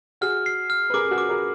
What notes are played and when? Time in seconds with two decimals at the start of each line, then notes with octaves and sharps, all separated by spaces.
0.21 F#4 G#4 F6
0.46 C7
0.70 F6
0.90 B4
0.94 G#4 A#4 D6
1.11 F#4 G#4
1.18 D6
1.29 G#4 A#4